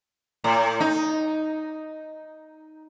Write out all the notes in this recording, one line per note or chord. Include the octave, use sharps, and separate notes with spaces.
A2
D#4